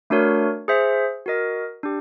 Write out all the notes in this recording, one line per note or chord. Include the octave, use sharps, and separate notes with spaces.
A3 D4 F#4 A#4 C#5
G#4 C5 E5
F#4 A#4 D#5
D4 G4